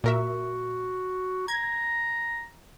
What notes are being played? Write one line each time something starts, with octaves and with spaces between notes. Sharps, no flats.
A#2 F#4 A#4 E5
A#5 G#6